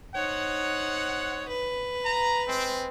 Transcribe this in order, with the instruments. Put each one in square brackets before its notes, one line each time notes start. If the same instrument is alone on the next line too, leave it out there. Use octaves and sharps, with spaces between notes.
[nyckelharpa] D#4 C#5 [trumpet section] C5 F#5
[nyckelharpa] B4
[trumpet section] A#5
G#3 C4